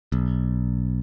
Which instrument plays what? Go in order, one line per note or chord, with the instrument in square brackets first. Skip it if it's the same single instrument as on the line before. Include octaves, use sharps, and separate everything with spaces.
[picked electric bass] B1